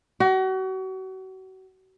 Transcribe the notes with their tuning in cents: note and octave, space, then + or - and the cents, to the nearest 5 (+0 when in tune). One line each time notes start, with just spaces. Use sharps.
F#4 +35